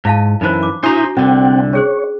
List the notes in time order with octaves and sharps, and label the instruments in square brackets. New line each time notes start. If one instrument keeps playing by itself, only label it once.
[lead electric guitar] G#2 [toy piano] E4 F5 A5
[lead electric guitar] F#2 E3 [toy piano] D#4 C5
[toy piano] D6
[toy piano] D4 F#4 C#6 [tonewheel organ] E4 D#6 G6 [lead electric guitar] C5 A#5
[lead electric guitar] C2 D3 [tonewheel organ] C4 F#5 G5
[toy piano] C#4 G#4 C5 [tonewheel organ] C#5